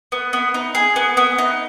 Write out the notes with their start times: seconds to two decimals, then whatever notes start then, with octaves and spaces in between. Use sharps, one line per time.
0.12 B3
0.33 B3
0.54 D#4
0.75 G#4
0.96 B3
1.17 B3
1.38 D#4